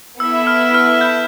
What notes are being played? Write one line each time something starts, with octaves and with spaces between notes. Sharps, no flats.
B3 E4 A4 E5 E6
F6
F6
G6